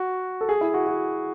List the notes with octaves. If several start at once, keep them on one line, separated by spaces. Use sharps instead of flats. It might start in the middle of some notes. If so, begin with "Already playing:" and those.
Already playing: F#4
A4
G#4
E4
F#4
F#4